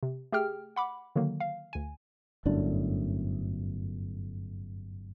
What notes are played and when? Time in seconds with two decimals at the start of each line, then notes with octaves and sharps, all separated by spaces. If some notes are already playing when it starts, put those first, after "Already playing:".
0.03 C3
0.32 A3 G4 G#4 G5 F6
0.76 F#5 B5 D6
1.15 D3 D#3 F#3 A#3
1.40 F5
1.73 D2 G#5
2.46 G1 F#2 A2 D4